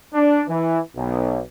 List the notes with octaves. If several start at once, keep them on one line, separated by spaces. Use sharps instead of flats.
D4
E3
B1